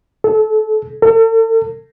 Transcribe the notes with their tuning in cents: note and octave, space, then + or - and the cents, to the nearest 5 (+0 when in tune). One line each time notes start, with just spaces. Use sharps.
A4 -25
A4 +40